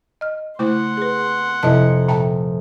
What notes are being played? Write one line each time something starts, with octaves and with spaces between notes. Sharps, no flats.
D#5 F6
C#3 A3 E4 C5 F#5 C6
G#4 B4
F1 E4 D#5 A5 C#7
A#2 E5 G5 A5